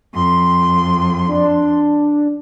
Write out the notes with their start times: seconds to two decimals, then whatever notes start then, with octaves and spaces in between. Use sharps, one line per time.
0.13 F2 C6
1.28 D4